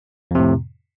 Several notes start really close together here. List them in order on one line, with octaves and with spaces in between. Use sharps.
F2 C3 A2